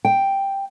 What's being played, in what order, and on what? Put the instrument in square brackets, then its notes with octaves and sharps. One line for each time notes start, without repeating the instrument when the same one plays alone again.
[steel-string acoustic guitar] G5